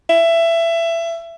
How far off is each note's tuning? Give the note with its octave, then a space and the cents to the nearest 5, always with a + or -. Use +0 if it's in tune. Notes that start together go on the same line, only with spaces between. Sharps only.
E5 +20